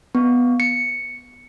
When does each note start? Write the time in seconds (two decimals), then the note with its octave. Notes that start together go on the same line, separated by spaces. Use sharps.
0.15 B3
0.60 C#7